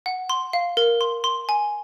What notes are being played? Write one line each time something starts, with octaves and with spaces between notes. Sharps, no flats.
F#5
C6
F5
A#4
C6
C6
G#5